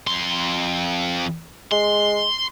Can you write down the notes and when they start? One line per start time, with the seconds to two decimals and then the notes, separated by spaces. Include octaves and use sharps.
0.07 F2 C6
1.72 G#3 C6